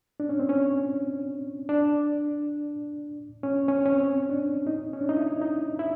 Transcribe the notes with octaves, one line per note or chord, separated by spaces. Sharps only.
D4
C#4
C4
C#4
D4
C#4
C#4
C#4
C4
D4
D#4
C#4
D4
D#4
E4
D#4
E4